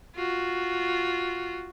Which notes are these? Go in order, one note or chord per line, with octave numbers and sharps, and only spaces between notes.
F4 F#4